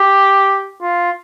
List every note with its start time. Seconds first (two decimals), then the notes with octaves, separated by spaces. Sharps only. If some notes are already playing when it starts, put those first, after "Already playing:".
Already playing: G4
0.82 F4